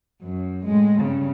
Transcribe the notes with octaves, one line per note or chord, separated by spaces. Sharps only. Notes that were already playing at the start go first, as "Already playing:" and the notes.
F#2
A2 G#3
G2 C#3